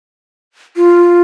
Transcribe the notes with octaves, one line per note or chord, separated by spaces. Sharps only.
F4